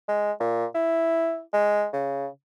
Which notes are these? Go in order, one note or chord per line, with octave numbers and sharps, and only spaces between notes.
G#3
A#2
E4
G#3
C#3